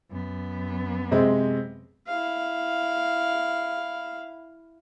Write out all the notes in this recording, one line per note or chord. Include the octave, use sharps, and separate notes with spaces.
F#2 B3
C3 G#3 C4
E4 F5